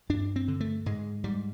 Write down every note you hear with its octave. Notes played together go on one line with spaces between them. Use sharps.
G2 D4
C4
D3
A3
G#2 G#3
G#2 G3